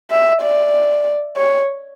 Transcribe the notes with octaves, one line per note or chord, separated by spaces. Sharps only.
E5
D5
C#5